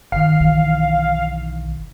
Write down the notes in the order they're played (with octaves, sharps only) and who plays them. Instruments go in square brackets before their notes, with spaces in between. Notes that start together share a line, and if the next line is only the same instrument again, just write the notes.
[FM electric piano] G1 D#3 [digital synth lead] F5
[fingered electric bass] B1 E3